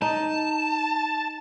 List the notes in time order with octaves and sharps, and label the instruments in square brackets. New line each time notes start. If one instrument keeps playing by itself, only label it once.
[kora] D#4 [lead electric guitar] A5